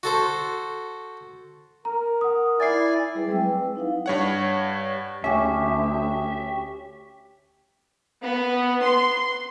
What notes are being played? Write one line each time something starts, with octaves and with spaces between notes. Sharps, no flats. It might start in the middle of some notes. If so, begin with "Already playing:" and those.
F#4 A4 C5
A#4 A#5
F#5 D#6
E4 D5 G#5 A6 C7
G3 E4 G#4 B4
F#3 G#3 C4 E5 G5 E6
B4
D#4 E4 F5 F#5
G2 C#5 F#5
D2 C#4 G4 E5
B3
C6